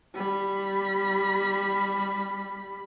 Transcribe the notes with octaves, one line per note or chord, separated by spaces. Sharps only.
G3 B5